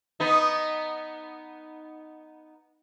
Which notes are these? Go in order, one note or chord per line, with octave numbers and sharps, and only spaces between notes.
B3 D#4